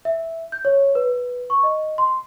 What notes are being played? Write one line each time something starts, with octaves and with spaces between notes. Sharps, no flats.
E5
G6
C#5
B4
C#6
D#5
C6